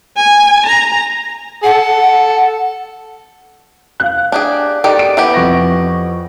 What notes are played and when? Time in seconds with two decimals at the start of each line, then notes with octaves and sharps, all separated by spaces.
0.17 G#5
0.66 A#5
1.64 A4 F#5
4.00 F5 F#6
4.32 D4 G4 G#4
4.84 D#3 G4 A4 D5
4.99 D7
5.17 E3 B3 G4
5.34 F2 C#6 A#6